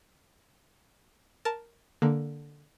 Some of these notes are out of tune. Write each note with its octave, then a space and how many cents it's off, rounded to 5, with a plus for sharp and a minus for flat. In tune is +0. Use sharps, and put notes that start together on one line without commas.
A#4 +0 A5 +0
D3 +0 A#3 +0